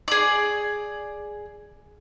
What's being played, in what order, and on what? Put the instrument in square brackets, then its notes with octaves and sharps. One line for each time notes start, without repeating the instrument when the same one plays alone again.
[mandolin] G#4 D5